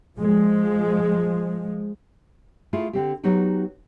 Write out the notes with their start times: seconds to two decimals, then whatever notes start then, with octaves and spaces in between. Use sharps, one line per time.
0.18 F3 G#3
2.73 A3 E4 F4 G#4
2.93 D3 C4 G4
3.24 F#3 B3 D#4 F#4 G4